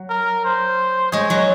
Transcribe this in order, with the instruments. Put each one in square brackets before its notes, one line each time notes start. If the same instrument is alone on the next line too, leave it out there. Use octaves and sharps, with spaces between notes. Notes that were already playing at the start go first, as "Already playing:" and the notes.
Already playing: [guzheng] F#3
[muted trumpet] A#4
C5
[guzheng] G#3 G#4 [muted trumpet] C#5
[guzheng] F#3 F#4